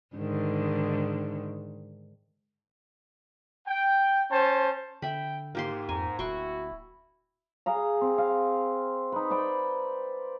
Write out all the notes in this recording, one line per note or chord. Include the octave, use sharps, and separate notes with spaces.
G#2 D3 D#3
G5
C#4 C5 A5
D3 E5 G5 B5
G#2 A#3 G4 C6
F2 G#5 A#5
D1 E4 F#4 G5 C6 C#6
G#4 F5 A#5
C4
F5
D#4 B4
B4 C5 D5 G5